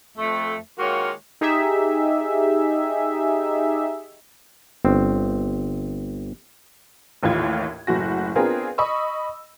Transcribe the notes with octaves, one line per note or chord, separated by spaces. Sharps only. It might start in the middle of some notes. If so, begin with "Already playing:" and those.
F2 A3
D#3 G#3 A#3 F4 F#4 C#5
D#4 G4 G#4 E5
G1 C4
A1 D#2 A2 F4 G#6
F#1 A2 F#4 A#6
B3 C4 D4 F4 G#4 A#4
D#5 B5 C#6 D#6 E6